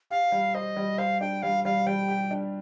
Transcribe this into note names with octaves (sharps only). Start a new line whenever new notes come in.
G4 F5
G3
C5 D#5
G3
C5 F5
D4 G5
G3 F5
G3 F5
G3 G5
G4
D4